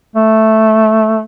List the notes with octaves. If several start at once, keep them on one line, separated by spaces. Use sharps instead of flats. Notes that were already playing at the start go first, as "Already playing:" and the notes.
A3